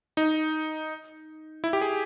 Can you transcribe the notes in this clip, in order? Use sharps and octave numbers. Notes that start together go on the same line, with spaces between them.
D#4
E4
G4
G#4